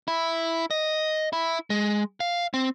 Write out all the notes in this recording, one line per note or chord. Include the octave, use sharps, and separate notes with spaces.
E4
D#5
E4
G#3
F5
C4